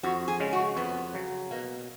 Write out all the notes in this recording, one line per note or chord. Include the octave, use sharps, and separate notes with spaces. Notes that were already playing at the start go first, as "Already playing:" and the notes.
F2 F#4
G#4
C#3 G#3 C#4
F#4
F2 B3
C#3 F#3
B2 A#3